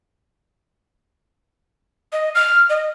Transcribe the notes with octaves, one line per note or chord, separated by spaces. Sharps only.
D#5
F6
D#5